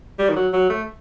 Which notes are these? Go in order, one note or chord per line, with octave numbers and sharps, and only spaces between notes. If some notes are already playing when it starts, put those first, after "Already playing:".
G3
D#3
F#3
F#3
A3